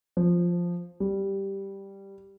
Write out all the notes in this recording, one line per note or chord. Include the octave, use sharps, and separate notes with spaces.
F3
G3